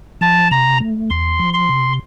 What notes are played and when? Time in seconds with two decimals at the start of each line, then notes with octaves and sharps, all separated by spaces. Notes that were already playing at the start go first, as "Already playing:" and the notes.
0.21 F3 A5
0.51 C3 A#5
0.80 A3
1.10 E2 C6
1.39 F3
1.54 C6
1.69 C3